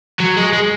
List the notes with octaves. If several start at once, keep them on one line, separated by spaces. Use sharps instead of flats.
F#3
G#3
G#3